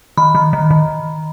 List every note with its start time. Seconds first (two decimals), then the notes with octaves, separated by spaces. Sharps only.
0.17 D#3 B5
0.35 D#3
0.53 D#3
0.71 D#3